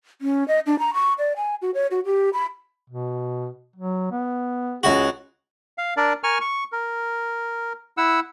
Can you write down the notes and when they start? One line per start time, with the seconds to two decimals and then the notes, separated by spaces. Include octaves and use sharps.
0.21 C#4
0.48 D#5
0.66 D4
0.79 A#5
0.94 C#6
1.19 D5
1.36 G#5
1.62 F#4
1.74 C#5
1.91 F#4
2.05 G4
2.33 B5
2.90 B2
3.76 F#3
4.11 B3
4.83 C#2 F#4 G#4
5.78 F5
5.97 D4 A#4 D5
6.24 A#4 G#5 C#6 F6
6.41 C#6
6.72 A#4
7.97 E4 F#5 E6